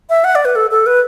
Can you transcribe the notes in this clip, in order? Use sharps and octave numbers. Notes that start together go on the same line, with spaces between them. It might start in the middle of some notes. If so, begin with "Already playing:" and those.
E5
F#5
D5
B4
A4
A4
B4